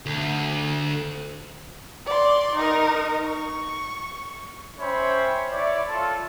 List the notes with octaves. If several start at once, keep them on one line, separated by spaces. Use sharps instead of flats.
D2
D5 C6
D#4 A#4
C#6
C#4 C5 C#5 E5 G5 B5
E4 C#5 D5
F4 A4